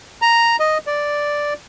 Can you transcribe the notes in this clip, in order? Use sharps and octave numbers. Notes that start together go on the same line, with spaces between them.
A#5
D#5
D5